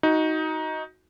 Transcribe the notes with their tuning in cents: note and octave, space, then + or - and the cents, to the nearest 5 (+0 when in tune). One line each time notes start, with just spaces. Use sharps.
D#4 +15 F#4 +0